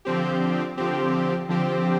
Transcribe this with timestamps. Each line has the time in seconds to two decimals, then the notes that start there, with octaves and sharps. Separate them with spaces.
0.05 D3 F3 C4 G4
0.77 D3 F3 C4 G4
1.49 D3 F3 C4 G4